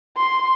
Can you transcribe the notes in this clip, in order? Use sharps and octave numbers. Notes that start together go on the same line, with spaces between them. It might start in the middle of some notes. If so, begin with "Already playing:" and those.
C6